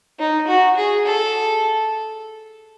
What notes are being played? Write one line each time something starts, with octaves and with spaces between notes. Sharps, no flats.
D#4
F#4
G#4
A4